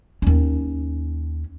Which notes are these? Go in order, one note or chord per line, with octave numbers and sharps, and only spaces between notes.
D#2 C#4